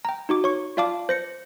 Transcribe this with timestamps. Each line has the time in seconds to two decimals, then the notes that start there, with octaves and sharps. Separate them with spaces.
0.05 G5 A#5
0.29 D#4 F#4 D6
0.44 C#5 C#6
0.77 F4 D5 F5 A5 D6
1.09 C5 A#6 C#7